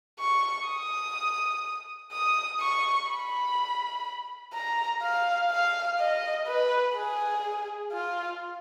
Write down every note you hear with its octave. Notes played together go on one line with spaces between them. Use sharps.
C#6
D#6
D#6
C#6
B5
A#5
F5
F5
D#5
B4
G#4
F4